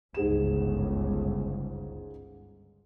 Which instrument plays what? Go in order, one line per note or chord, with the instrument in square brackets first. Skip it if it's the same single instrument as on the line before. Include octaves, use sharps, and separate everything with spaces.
[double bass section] G1 C#2 [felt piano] G#2 G#4 E7